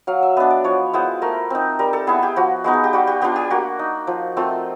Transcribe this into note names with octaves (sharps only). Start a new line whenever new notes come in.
F#3 F5
E5
B3 D4 D#5
D5
F3 C#5
G#3 B3 E4 C5
A3 A#4
C4 D#4
G3 A#4
A4
B3 E4 G#4
G4
F3 F#4
G#3 B3 D#4
G#4
G4
G3 F#4
G4
B3 D4 F4 G4
G4
A#3 F#4
D#4
F3
A3 C4 F4